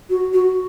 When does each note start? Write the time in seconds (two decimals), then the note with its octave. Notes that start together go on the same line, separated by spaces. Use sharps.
0.10 F#4
0.33 F#4